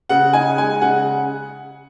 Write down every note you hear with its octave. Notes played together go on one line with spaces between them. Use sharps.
C#3 F#5
D#4 G#5
G#3 G#5
C#3 F#5